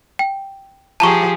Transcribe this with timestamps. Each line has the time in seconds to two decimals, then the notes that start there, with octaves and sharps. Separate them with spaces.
0.19 G5
1.00 F3 G4 G#4 A5 A#5 C#6